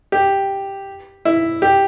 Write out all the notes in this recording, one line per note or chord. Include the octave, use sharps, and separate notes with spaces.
G4
E4
G4